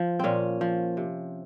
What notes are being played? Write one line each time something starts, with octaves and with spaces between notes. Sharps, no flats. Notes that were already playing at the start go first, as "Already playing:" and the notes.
Already playing: F3
A#2 C4 C#4
F3
C3